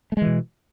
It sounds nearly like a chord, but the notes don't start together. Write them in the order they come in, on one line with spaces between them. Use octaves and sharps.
A3 G#3 E3 B2